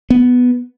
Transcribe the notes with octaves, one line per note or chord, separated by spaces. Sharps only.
B3